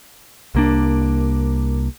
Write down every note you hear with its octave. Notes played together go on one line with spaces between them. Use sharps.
C2 A#3 D4